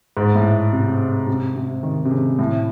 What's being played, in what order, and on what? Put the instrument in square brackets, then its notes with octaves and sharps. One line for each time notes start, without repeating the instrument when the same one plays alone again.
[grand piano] G#2
A2
C3
C3
C3
D#3
C3
C#3
A2